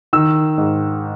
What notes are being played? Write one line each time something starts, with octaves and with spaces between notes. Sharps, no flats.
D#3 E6
G#2